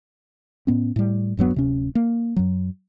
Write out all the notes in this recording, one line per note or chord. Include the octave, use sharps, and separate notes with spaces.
A2 B3 C#4
A2 G3
E1 G2 F#3 B3
D1 C3 C#4
A#3
F#2 F#3